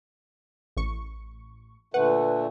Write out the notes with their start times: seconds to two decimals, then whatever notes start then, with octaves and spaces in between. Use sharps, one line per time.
0.77 A1 C#6
1.94 A#2 D3 A3 B4 F#5